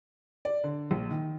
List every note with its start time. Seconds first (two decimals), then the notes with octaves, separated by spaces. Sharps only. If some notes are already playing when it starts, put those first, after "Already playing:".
0.45 D5
0.64 D3
0.91 A#1
1.11 D#3